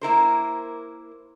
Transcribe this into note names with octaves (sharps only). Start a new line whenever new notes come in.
A#3 E4 A#4 C5